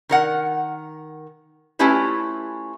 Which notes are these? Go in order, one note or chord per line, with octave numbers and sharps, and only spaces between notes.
D#3 A#4 F#5
A3 C#4 E4 F4 G4 B4